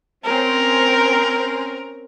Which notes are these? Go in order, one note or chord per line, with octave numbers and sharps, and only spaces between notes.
C4 C#4 A#4